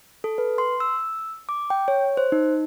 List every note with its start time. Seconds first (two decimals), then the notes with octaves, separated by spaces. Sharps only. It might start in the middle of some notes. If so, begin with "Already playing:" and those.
0.24 A4
0.38 B4
0.58 C6
0.80 E6
1.49 D6
1.70 G5
1.88 C#5
2.17 C5
2.32 D#4